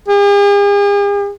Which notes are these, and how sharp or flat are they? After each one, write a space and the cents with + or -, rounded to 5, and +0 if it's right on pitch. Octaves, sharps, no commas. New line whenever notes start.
G#4 -45